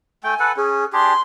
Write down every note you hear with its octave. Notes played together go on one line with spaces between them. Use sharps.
A3 G5 G#5
A4 B4 F#5
C#4 G#4
D4 G4 G#4 C6